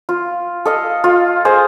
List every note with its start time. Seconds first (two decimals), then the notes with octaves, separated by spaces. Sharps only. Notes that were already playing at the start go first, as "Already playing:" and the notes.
0.09 F4
0.65 A4 D#5 F5
1.04 F4
1.45 G#4 C5 D#5